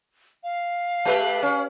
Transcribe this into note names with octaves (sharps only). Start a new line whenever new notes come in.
F5
G#3 G4 B4
C#4